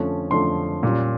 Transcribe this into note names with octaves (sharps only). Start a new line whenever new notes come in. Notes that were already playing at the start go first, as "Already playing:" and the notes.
Already playing: F2 D3 F3 A3 C#4
F2 D3 F3 A3 C#4 C6
A#2 G3 A#3 C#4